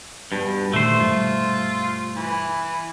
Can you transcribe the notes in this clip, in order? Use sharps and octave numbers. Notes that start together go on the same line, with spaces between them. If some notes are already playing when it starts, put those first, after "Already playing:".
G2 B2
A#2 D#3 A3 C5
G2 B2 G3 F4
E3